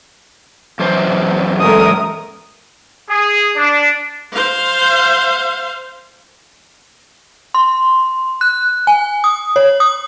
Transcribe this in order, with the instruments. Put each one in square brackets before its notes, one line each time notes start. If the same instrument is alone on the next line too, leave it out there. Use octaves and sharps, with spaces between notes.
[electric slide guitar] F#2 E3 C5
[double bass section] G#3 A3 [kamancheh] A#4 D#6
[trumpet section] G#4
D4
[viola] C5 F5
[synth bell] C6
F#6
G#5
D#6
C#5
D#6